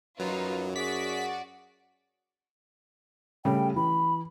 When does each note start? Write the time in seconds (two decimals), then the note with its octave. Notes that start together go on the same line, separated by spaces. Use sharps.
0.20 F#2 F#3 D#4 F4 B4
0.76 F#4 G#4 D5 B6
3.45 C#3 G3 A3 G5
3.76 E3 B5